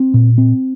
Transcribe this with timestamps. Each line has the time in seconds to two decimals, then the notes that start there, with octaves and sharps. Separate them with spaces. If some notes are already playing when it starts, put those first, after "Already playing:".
Already playing: C4
0.14 A#2
0.38 C4